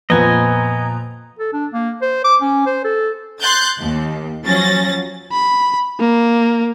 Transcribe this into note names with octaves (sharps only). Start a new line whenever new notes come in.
F2 A#2 F3 B3 D#5 G#5 A#5
A4
D4
A#3
C5
D6
C#4
C5
A4
C6 F#6 G6 A6
D#2
F3 F#3 C#4 A6 A#6
B5
A#3